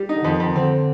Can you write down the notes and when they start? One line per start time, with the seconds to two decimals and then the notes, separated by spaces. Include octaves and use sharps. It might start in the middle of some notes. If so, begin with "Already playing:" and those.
Already playing: G3
0.09 D#4
0.15 D3
0.24 F2 D#3
0.40 F2 D#3
0.56 D3 C4